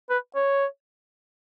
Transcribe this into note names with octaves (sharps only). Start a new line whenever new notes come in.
B4
C#5